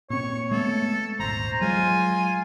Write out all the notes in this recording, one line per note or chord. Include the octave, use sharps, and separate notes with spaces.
A#2 C4 C#5 C#6
G#3 A3 B3 A4
D#1 G#1 C5 A#5
F#3 G#3 F4 G#5